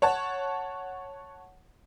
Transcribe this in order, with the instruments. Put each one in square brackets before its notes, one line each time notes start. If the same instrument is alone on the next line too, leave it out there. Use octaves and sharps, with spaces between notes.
[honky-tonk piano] C#5 F#5 A5